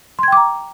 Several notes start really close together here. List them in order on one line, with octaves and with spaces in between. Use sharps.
C6 G#6 G5 D6 A#5